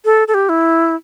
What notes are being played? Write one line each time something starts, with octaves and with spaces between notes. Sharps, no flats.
A4
A4
G4
E4